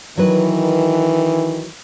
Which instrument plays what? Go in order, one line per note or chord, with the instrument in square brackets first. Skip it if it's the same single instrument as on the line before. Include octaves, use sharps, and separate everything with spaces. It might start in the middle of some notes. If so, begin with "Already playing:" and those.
[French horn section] D#3 E3 [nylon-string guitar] F#3 B4